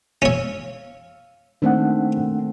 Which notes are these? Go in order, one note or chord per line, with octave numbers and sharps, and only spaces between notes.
C#4 C#5 F5 E6
D#3 A3 A#3 C4 D4 F#5